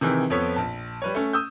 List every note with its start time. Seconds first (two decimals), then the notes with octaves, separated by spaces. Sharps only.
0.01 C3 D#3 E3 G#4
0.30 F2 F3 B3 A4 C#5 B6
0.56 A#1 A5
1.02 G3 B4 C#5
1.15 A3 C#4
1.33 D#6 E6 G6